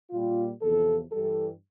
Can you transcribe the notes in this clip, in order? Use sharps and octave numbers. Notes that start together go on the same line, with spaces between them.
A#2 G3 F4
E2 C3 F3 A4
G2 E3 G3 A4